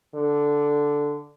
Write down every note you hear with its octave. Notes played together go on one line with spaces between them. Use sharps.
D3